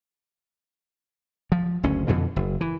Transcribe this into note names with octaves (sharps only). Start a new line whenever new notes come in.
F3
F#1 D2 C#4
F2 B2 D3 E3
F#1
E3